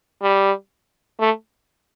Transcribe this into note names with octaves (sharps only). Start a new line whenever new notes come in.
G3
A3